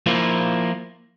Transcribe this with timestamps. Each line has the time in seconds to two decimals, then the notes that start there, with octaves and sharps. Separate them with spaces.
0.06 F3 A#3 E4 F4